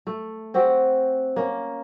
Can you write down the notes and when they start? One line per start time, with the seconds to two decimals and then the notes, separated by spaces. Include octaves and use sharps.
0.07 A3
0.54 C4 F#4 G4
1.36 A#3 C#4